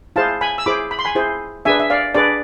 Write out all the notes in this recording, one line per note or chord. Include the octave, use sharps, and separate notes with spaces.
E4 G#4 C5 F5 A5
G#5 B5
E6
E4 G#4 C5 B5 D6
B5
C6
G#5 B5
E4 G#4 C5
D4 G#4 B4 E5 G#5
E5
D5 F5
D4 G#4 B4 D5